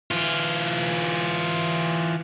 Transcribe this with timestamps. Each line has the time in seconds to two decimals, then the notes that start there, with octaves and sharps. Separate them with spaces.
0.11 E3 F4